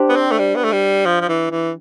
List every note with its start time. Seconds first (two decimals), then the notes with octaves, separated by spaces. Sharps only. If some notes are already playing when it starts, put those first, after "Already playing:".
Already playing: D4 G4 C5
0.09 B3
0.16 C4
0.32 A3
0.39 G3
0.55 B3
0.64 A3
0.72 G3
1.06 F3
1.21 F3
1.29 E3
1.51 E3